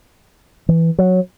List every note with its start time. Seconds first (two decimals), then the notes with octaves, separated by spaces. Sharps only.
0.69 E3
0.98 F#3